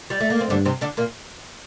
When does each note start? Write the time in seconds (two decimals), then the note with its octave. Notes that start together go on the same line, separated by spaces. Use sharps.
0.10 G3
0.20 A3
0.30 A#3
0.41 C4
0.50 G2 D3 D4
0.65 C3 C4
0.81 D3 D4
0.97 A#2 A#3